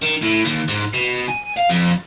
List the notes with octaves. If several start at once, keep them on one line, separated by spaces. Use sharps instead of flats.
D#3
A2
D#2
G#2
B2
G#5
F5
F2